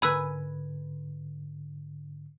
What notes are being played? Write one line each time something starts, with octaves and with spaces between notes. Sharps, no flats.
G#2 D3 B4 G#5 B5 E6